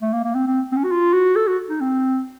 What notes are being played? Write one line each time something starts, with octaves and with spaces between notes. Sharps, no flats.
A3
A#3
A#3
C4
C4
C4
C#4
F#4
F4
F#4
A4
F#4
D#4
C4